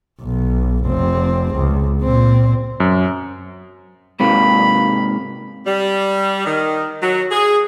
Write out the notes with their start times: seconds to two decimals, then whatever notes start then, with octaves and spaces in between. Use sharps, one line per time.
0.22 B1
0.86 F1 C4
1.56 C#2
2.02 A#2 C4
2.80 F#2
4.20 G#2 C3 A#3 B5
5.66 G3
6.46 D#3
7.02 F#3
7.31 G#4